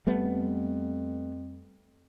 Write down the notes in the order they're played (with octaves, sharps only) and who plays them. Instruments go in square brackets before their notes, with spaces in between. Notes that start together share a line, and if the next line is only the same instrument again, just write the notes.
[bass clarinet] F2 [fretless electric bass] G3 A3 B3